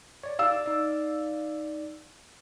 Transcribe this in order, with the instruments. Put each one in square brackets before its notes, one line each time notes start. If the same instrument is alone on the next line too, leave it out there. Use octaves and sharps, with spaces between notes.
[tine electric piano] C#5 D5
[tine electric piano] D5 [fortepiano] F5 E6
[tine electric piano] D#4 D5